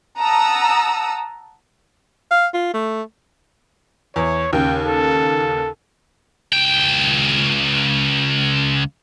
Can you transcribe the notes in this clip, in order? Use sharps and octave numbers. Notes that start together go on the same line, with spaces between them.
F#5 A5 A#5 D#6 E6
F5
F4
A3
E2 C#5
D#2 C#3 G5
A4
C#2 G5